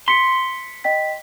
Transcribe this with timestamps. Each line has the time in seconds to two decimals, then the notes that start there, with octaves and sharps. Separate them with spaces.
0.08 C6 B6 C#7
0.84 D#5 G5 B6